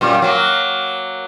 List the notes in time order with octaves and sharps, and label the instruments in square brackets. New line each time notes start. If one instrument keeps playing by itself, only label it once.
[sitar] F#2 A#2 G3
F#3 A#3